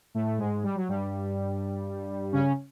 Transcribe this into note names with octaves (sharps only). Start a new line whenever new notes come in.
A2 A3
G#2 G#3
G3
F#3
G2 G3
C#3 C#4